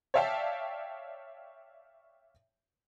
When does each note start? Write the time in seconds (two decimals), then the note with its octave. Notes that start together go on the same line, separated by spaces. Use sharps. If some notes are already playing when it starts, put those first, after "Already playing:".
0.14 C#5 D5 E5 F5 G5 A5